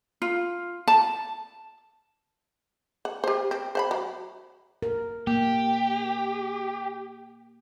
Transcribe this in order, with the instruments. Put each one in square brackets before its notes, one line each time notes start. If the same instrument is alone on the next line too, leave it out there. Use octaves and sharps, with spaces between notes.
[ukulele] F4
A5
[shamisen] F#5
G4 C5
C4
C5 F#5 B5
F#3
[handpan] A#4
[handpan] A#3 [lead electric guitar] G4